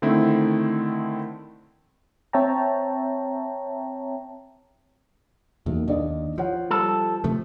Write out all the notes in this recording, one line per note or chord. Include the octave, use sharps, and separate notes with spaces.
D3 D#3 A3 C4 E4
C4 C#5 E5 G5 A5 A#5
B1 E2 A#3
D#2 D4 D5 D#5
F3 C#5 F#5
G3 A4
C3 F3 A3